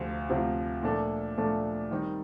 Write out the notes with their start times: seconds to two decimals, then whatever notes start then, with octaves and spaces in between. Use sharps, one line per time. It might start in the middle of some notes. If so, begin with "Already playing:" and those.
Already playing: D2 C3 F3 C4 F4
0.29 D2 C3 F3 C4 F4
0.83 A#2 F3 A3 D4 A4
1.38 A#2 F3 A3 D4 A4
1.91 D#3 G3 C4 D#4